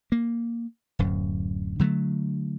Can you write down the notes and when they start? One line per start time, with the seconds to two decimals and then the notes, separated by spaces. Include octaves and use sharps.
0.12 A#3
0.99 D1 F#2
1.79 D3 F#3 G#3 A3